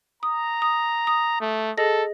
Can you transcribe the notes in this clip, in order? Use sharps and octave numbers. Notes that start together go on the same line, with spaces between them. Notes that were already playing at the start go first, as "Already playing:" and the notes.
A#5 D#6
D#6
D#6
A3
G#4 A4 D#5 A#6